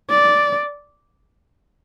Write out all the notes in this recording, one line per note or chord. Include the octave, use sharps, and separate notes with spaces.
D5